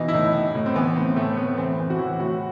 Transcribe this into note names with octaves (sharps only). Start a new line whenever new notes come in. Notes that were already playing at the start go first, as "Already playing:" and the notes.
Already playing: B2 E3 D#4
E4
A2 D#4
A2
A2
C4
E3 B3
A2 C4
A2 A3
A2 B3
E3 C4
E3
F#4
E3 E4
A2 F#4